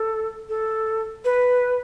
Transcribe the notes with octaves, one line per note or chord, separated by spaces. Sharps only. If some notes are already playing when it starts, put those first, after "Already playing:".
Already playing: A4
A4
B4